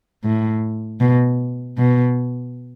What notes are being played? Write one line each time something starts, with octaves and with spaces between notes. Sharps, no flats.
A2
B2
B2